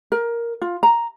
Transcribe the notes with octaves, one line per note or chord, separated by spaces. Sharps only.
A#4
F4
A#5